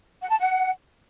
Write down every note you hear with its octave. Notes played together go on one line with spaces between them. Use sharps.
F#5
A5
F#5